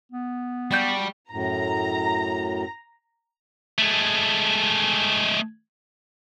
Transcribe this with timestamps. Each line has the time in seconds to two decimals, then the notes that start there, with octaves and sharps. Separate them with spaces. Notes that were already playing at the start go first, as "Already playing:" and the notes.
0.12 B3
0.71 G3 D4 F#4 G6
1.31 F#2 A2 A#5
3.78 G#3 A3